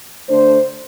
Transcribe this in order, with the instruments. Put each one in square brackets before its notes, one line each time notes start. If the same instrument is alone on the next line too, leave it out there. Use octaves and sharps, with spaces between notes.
[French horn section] D3 A3 D4 C5